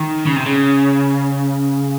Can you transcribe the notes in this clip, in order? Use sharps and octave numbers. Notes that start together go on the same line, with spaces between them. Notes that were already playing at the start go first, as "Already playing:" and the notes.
Already playing: D#3
C#3
C3
C#3